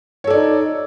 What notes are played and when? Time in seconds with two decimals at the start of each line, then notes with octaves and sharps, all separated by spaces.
0.24 C#5
0.27 A4
0.30 D5
0.33 D#4